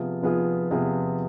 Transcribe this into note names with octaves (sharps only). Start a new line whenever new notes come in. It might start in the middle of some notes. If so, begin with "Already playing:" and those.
Already playing: C3 F3 B3 F4 G#4
C3 F3 B3 F4 G#4
C3 F3 B3 F4 G#4